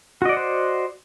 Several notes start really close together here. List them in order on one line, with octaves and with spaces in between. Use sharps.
F#4 D#5 D5 F#5 C5